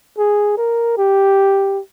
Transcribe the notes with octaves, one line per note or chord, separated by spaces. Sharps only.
G#4
A#4
G4